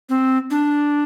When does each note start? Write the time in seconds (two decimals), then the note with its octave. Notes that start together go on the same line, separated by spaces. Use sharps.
0.09 C4
0.50 D4